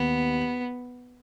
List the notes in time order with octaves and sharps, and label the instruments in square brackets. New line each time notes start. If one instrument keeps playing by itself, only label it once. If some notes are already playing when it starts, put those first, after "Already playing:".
Already playing: [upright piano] D#2 [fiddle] B3